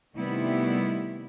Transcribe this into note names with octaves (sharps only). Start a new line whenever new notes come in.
C3 D#3 G3 A3 B3 E4